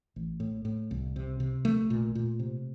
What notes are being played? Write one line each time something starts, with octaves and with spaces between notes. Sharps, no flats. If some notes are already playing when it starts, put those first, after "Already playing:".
A1
A2
A2
C2
C3
C3
A#1 A3
A#2
A#2
C3